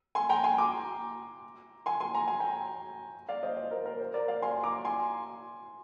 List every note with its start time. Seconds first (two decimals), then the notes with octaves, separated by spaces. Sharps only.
0.15 G#5 C6
0.29 G5 A#5
0.44 G#5 C6
0.58 A#5 D6
1.86 G#5 C6
2.00 G#5 C6
2.15 A#5
2.28 G#5
2.40 G5 A#5
3.29 D5 F5
3.43 C5 D#5
3.57 C5
3.71 A#4
3.86 A#4
4.00 C5
4.14 A#4 D5
4.28 D5 F5
4.42 G#5 C6
4.64 A#5 D6
4.85 G#5 C6